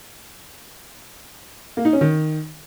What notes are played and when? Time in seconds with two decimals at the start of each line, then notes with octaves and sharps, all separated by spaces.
1.77 A#3
1.85 D#4
1.93 C#4
2.01 D#3